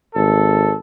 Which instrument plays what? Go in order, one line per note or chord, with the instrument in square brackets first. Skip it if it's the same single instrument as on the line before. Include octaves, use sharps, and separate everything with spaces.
[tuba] G#1 [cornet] A4